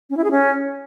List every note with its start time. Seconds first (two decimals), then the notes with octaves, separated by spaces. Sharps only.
0.10 C#4
0.17 E4
0.24 G#4
0.31 C#4